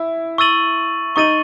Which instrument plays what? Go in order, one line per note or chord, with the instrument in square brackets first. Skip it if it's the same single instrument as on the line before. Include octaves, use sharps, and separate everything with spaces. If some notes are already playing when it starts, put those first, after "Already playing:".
Already playing: [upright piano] E4
[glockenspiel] C#6 E6 A6 D#7 F#7
[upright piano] D#4 [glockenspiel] C#6 E6 A6 D#7 F#7